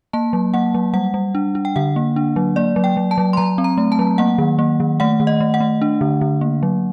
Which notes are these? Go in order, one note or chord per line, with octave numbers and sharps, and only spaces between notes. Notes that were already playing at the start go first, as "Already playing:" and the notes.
A#3 A5
F#3
A#3 F#5
F#3
G3 F#5
G3
D4
D4
G5
D3 F#5
A#3
D4
F#3
A#3 D5
F#3
G5
F#3
A5
F#3
C6
F#3 A#5
C4
A#5
A3
A5
F#3
A#3 F#5
D#3
A#3
D#3
A3 F#5
D#3
D#5
A3
F#5
A3
D4
D3
D3
A#3
F#3